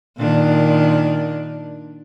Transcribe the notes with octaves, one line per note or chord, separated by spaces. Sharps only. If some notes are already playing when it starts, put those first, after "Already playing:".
A#2 D#3 D4